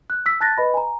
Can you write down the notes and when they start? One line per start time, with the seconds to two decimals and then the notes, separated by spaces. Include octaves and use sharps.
0.10 F#6
0.26 E6 B6
0.41 A5 F#6 A6 A#6
0.58 B4 D#5 B5
0.74 G#5 A#5